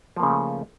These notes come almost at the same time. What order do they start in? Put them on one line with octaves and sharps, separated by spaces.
F3 A#3 C#3 C#4 A3